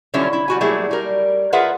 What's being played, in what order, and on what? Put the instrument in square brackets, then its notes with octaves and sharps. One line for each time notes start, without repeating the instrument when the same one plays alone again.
[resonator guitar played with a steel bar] D3 F#3 G3 C#4 E4 F4
E4
G3 F#4 G#5
F#3 G3 A3 A#3 E4 G#4
G3 A#4
F4 G#4 A#4 B4 E5 F#5